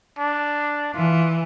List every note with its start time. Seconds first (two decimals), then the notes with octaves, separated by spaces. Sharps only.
0.18 D4
0.94 E3 F4